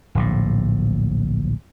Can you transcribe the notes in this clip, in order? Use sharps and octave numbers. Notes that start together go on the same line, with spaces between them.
D1 A#1 A2